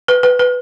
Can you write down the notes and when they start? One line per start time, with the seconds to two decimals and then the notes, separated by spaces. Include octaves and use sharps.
0.08 B4
0.23 B4
0.39 B4